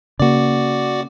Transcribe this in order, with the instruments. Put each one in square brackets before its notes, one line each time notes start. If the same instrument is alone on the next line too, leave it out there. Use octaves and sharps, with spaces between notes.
[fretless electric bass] C#3 A#3 [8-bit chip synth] F#4 D5